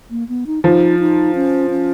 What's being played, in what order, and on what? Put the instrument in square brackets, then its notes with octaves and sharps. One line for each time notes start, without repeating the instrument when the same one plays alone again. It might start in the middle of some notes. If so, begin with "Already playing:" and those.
[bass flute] A#3
B3
D#4
[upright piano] F3 [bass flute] D#4
[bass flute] D#4
C#4
C#4